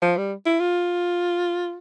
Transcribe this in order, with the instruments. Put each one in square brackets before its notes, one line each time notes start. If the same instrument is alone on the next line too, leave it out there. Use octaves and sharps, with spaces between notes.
[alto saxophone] F3
G3
E4
F4